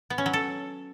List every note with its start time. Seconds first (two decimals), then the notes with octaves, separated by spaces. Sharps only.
0.10 B3
0.18 C#4
0.26 F#3
0.33 A4